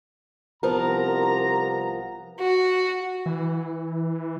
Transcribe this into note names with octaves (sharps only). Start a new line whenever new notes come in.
C2 C3 F3 B3 A#4 A#5
F#4
E3